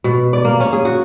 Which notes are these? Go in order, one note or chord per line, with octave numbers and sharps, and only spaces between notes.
B2
D5
A#3
C#4
G#4
F#4